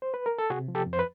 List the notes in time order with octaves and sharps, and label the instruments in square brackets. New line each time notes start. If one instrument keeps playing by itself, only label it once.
[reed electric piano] C5
B4
A#4
A4
C3 F#4 G#4
F3
G4 A4
F2
C5
B4